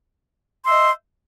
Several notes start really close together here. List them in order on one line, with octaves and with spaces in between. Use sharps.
C6 E5 D#5